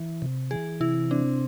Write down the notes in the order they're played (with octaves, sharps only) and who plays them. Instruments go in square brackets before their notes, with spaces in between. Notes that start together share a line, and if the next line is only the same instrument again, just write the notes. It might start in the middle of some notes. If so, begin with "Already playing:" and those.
Already playing: [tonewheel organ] E3
C3
[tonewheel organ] E3 [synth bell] G#4
[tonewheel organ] C3 [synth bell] E4
[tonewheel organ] C4 [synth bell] D4